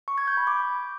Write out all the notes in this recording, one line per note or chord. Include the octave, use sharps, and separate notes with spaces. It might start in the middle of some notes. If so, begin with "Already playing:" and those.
C#6
G#6
G6
B5
D6